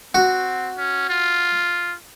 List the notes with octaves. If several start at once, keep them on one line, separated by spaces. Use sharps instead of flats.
C4 F#4
C#4
F4